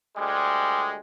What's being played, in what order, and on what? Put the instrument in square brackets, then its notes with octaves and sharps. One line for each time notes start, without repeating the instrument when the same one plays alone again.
[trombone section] D2 G3 G#3